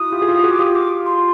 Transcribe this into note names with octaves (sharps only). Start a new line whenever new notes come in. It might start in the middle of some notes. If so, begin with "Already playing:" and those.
Already playing: E4 F#4 D#6
F4 G4
G#4
F4 G4
F#4 G#4
D6
F4 G4 D#6
D6
C6